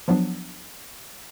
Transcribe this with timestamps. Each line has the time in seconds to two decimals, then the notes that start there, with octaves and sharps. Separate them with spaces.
0.08 F3 F#3 B3 D4